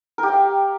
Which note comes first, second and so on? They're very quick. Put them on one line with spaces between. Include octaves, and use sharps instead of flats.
A#4 G4 G5 F5